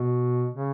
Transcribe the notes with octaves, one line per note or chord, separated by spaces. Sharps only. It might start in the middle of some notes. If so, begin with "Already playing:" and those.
Already playing: B2
C#3